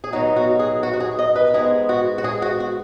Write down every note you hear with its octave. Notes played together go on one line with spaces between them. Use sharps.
G#4
B2 F#3 D#4 F#4
F#4
G#4
F#4
F#4
G#4
D#5
B4
G#2 G#3 B3 G#4
F#4
F#4
G#4
F#4
F#4